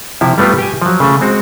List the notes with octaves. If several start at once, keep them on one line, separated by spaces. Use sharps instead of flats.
C3 F3 E4
G3 A3 B3 F4 G4
G4 G5 G#5
F3 F#3
C#3 A3
G#3 C4 F#4